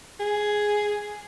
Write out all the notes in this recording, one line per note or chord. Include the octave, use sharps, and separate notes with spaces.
G#4